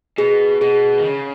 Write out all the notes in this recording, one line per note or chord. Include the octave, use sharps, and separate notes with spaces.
B2 G#4
B2 G#4
D#3
C#3